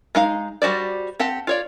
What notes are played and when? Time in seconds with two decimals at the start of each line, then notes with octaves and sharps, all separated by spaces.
0.15 G#3 D#4 F5
0.62 G3 F#4 C5 D5
1.19 C4 G4 F#5 A5
1.47 F4 C#5 D5